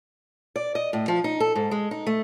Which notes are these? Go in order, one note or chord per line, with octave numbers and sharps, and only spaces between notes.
D5
D#5
A2
F3
D#4
A4
G#2
G#3
D#4
A3